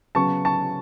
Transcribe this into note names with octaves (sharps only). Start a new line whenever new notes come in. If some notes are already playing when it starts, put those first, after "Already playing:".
C#3 F#3 B3 A5 C#6
A5 C#6